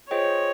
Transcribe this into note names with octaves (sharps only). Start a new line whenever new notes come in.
F4 G#4 C5 C#5 D#5 G5